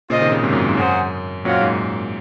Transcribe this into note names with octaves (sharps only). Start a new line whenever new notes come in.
A#2 C#3 F4 C5 D#5
C3 D#3
A#2 C#3
G#2 C3
F#2 A#2
G#2
F#2 A#3 C#4 G#4 C5 F#5
F#2 A#2 G#3 C4 F#4 C#5 F5
G#2